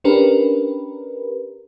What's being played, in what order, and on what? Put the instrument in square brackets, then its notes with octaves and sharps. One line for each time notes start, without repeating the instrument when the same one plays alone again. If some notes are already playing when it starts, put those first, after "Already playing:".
[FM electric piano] C#4 D4 G4 A#4 B4